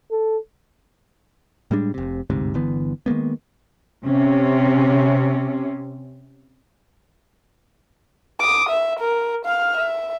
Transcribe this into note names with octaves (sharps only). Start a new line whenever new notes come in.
A4
A2 G3 G#3 D4
F1 C3
G1 D2 G#2 C3
G1 D3 E3 B3
D#3 G#3 A#3 B3
C3 C#4
D6 D#6
E5
A#4
F5 F6
E5